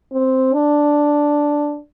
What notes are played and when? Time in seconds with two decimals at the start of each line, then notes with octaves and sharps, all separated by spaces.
0.12 C4
0.53 D4